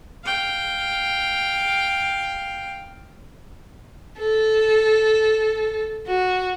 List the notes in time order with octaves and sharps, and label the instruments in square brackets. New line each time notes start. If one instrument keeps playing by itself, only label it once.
[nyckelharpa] F5 G5
[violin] A4
F#4